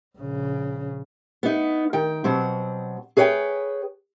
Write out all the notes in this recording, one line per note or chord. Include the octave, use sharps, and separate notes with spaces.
A#1 C#3
B3 D#4
D#3 G5
B2 F#3 C4
G#4 B4 C#5 F5 G5